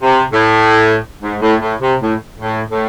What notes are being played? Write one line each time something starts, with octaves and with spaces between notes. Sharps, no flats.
C3
A2
G#2
A2
A2
C3
A2
A2
A2